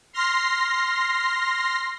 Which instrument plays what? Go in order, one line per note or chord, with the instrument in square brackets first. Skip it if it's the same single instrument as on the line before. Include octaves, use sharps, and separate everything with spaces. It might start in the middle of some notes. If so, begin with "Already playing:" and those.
[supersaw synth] C6 F6 A#6 C7